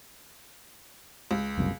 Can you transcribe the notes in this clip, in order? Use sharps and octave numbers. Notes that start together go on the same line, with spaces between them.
C#2
F#1 C2 F#2